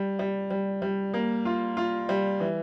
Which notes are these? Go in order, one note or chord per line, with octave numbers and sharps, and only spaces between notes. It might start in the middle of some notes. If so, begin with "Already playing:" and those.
Already playing: G3
G3
G3
G3
A#3
F4
F4
G3
E3